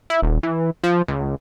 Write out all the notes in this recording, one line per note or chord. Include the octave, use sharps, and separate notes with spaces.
E4
D#1
E3
F3
C#2